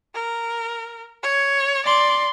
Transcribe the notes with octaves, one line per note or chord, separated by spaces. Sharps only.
A#4
C#5
D5 C6